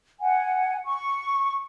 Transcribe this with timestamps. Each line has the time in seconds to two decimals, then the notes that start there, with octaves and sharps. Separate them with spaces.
0.20 F#5 G#5
0.84 C#6